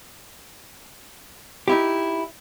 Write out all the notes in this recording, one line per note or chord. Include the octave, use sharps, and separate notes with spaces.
D#4 E4 G4